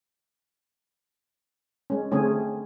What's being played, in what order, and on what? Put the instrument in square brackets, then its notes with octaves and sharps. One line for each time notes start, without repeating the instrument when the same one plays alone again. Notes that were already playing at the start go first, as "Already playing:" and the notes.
[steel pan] G#3 C#4
D3 A3 C4 C#4 G#4